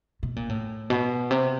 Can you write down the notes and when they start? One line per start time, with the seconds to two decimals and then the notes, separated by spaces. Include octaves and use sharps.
0.23 B2
0.36 A#2
0.49 A2
0.90 B2
1.31 C3